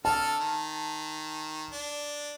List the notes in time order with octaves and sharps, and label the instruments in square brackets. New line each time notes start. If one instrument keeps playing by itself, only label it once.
[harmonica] D3 A4 F6 [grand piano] A5
[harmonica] D#3
D4